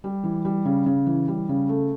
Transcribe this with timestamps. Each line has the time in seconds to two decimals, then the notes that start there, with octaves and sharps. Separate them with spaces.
0.04 G3
0.24 E3
0.45 G3
0.65 C#3
0.86 C#3
1.07 E3
1.28 G3
1.49 C#3
1.69 A3